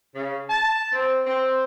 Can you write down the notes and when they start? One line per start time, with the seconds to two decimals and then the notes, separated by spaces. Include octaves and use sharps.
0.15 C#3
0.49 A5
0.92 C4
1.26 C4